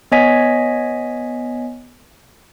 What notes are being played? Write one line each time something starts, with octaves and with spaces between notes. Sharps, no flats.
B3 C#5 D#5 G#5 B6